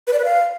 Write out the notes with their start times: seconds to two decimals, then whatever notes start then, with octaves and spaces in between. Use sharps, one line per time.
0.07 B4
0.13 D5
0.19 B4
0.25 F5